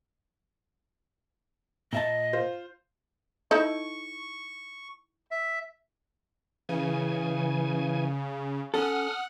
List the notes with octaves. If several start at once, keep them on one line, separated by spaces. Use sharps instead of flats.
A#2 D#5 E5 A5
F4 C5
D#4 E4 A4 C#6
E5
C#3 E3 G#5
C#4 A4 F#5 D#6 F6